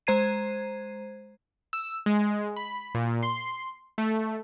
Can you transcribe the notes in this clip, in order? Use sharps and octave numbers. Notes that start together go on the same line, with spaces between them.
G#3 C5 A#5 G#6 C7 D#7
E6
G#3
B5
A#2
C6
A3